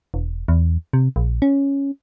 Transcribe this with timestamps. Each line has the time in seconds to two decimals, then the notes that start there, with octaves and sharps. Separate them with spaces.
0.14 E1
0.48 E2
0.93 C3
1.16 A#1
1.42 C#4